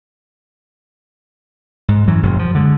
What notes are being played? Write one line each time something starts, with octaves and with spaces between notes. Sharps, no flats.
G#2
F#2 E3 F#3
F#1 F#2 A#2 F3
F3
D3 G#3